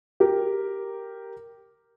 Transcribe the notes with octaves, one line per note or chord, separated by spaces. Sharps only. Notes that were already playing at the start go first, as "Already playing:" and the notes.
G4 A#4